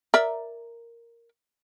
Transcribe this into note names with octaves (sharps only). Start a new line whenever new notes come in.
A#4 D5 E5